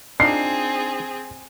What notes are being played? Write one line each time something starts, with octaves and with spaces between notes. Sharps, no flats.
C4 D4 D#4 F4 G#4 C7